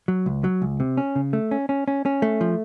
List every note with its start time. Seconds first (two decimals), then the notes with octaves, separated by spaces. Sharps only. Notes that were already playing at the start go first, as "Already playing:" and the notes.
0.08 F#3
0.26 C#2
0.44 F#3
0.62 C#2
0.80 C3
0.97 C#4
1.16 C#3
1.33 A3
1.51 C#4
1.69 C#4
1.88 C#4
2.05 C#4
2.22 A3
2.41 F3